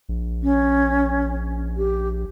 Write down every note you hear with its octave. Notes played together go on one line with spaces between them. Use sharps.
A#1
C#4
G4